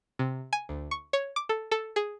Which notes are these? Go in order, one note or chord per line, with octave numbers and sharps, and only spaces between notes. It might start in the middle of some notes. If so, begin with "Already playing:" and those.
C3
G#5
D2
C#6
C#5
D6
A4
A4
G#4